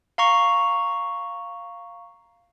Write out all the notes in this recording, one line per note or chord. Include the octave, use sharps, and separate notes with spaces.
F5 A#5 C#6